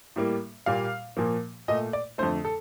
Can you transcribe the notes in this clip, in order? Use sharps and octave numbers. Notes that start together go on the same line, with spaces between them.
A2 G3 A#3
A#2 G3 A#3 F5
A#2 F3 A#3
A#2 A3 D#5
D5
F2 D3 A3 C5
A4